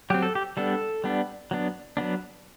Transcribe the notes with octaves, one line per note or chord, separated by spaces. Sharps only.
F#3 C4 G4
A4
G4
G3 B3 D4 A4
G3 B3 D4
F#3 B3 D4
F#3 B3 D4